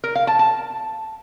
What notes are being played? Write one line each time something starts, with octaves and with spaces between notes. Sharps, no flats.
A#4
F5
A5
A5